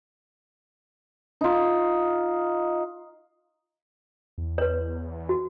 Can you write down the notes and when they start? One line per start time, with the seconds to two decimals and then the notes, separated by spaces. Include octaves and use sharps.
1.41 D#4 F4
4.38 E2
4.58 B4 C#5
5.29 F#4